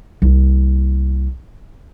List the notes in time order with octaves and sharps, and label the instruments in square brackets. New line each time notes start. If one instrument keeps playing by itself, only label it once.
[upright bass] C2 A#3